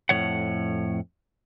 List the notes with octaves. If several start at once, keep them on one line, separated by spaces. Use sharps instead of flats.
F2 A2 F3 C#5 F#5